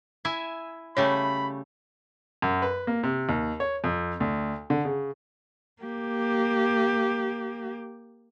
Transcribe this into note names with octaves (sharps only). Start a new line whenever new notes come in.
E4 E5 G#5
C#3 G3 A3 C#5 B5
F#2
B4
A#3
C3
D#2
C#5
F2
D2
D3
C#3
A#3 G4